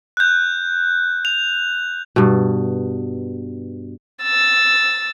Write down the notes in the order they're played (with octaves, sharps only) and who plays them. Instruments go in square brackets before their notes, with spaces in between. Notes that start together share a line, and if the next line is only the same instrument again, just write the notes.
[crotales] F#6 G6
F7
[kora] G2 B2
[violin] E6 A6